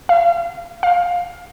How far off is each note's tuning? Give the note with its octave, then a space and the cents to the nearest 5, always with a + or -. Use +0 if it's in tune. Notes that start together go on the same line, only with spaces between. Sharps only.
F5 -35
F5 +15